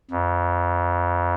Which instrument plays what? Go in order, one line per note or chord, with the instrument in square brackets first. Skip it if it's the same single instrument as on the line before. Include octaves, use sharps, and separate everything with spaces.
[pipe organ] F2